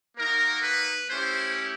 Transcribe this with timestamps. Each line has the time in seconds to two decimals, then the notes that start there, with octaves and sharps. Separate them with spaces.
0.17 A#3 D#4 F#4 A#4
0.63 B4
1.09 A3 C#4 E4 G4 C5